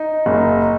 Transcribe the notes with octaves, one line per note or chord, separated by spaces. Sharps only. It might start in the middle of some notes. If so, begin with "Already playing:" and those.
Already playing: D#4
F#1